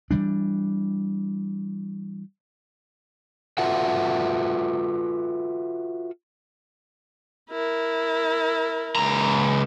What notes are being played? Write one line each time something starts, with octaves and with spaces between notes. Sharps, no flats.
E3 F#3 G3 D4
F4 F#4 A4 B4 E5 F#5
E4 A#4
C#2 A#5